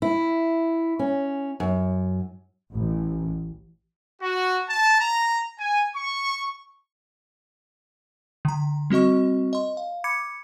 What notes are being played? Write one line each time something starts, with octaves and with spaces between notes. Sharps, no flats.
E4
C#4
F#2
A1
F#4
A5
A#5
G#5
C#6
D3 A#5
G3 C4 F#4 D#5 C#6
D#5 C6
F5
B5 D6 G#6 C#7